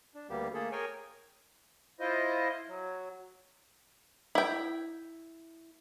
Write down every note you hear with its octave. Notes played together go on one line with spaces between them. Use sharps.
D4
D2 G3 A#3 B3 G4
A3 A#3 G#4 A4
G#4 A#4 C#5 G5 G#5
E4 F4 C5 D#5
F#3
E4 G5